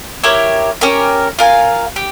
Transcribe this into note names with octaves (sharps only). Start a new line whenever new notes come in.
E4 G4 A#4 C#5
C#4 G4 A#4
F4 A#4 F5 G#5
G4